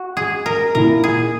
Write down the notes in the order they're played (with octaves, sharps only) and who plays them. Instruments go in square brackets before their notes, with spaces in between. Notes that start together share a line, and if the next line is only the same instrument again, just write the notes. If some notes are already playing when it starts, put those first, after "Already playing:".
Already playing: [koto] F#4
G#4
A#4
[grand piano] A#2 A#3 E4 [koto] A#4
[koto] G#4